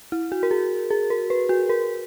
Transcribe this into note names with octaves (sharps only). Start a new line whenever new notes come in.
E4
F#4
A#4
G#4
G#4
A#4
B4
F#4
A#4